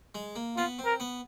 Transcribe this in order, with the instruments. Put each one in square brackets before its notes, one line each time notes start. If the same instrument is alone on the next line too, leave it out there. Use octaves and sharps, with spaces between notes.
[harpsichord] G#3
A#3
[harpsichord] B3 [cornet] F4
[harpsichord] C4
[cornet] A#4
[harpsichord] B3